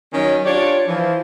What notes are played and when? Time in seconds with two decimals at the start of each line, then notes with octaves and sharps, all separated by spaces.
0.13 D#3 F#3 C#4
0.45 D4 F4 G4 C#5 D5
0.88 E3 F3